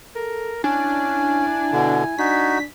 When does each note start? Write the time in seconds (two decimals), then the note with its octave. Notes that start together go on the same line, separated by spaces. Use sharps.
0.16 A4 A#4
0.64 C#4 D4 E4 G#5
1.72 B2 D3
2.18 D4 D#4 F#4 B6